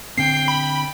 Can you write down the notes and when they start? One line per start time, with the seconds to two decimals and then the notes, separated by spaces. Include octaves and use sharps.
0.18 D3 C4 G5 C7
0.48 B5